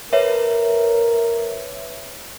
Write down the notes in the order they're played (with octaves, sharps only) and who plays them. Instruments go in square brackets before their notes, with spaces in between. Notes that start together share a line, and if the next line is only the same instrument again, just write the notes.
[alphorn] A#4 [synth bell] B4 C#5 E5